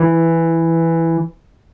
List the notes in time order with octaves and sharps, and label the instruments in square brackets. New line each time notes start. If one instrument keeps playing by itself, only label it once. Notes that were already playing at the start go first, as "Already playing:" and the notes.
Already playing: [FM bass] E3